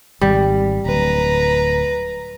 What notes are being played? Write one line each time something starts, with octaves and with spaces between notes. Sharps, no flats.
G#1 G3
D1 B4 A#5